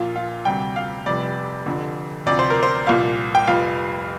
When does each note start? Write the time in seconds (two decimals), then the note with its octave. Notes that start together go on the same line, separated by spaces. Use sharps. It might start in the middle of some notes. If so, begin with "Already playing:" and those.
Already playing: A#1 A#2 F3 F4
0.16 F4
0.45 D2 C3 G3 G5
0.76 F5
1.06 F1 F2 C3 G3 D5
1.66 F1 F2 D3
2.26 D2 C3 F3 D5
2.39 C5
2.50 A#4
2.63 C5
2.87 C2 A#2 F3 F5
3.35 G5
3.47 F1 F2 F3 F5